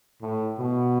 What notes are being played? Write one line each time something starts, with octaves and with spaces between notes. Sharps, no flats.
A2
B2